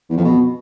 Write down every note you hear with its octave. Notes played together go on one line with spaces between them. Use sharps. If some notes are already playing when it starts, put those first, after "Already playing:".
E2
F2
B2